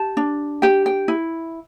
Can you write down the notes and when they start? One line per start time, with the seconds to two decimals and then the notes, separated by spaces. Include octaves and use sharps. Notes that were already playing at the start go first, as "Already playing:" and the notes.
Already playing: G4 A5
0.17 D4
0.62 G4 G5
0.86 G5
1.08 E4